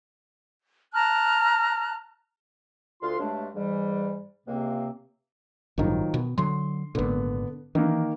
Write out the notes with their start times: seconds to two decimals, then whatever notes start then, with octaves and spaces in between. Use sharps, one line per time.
0.94 A5 A#5 F6 F#6
3.02 D2 F4 F5 C6
3.19 G2 F#3 G#3 A3 D4
3.54 G#2 E3 G3
4.47 C#2 C3 A#3 C4
5.78 A1 G2 D#3 F3 F#3
6.14 B2
6.38 D3 F#3 C6
6.95 G#1 A#2 D3 B3
7.75 D#3 E3 A#3